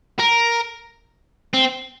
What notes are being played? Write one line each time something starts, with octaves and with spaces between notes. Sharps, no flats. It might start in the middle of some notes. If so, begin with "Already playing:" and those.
A#4
C4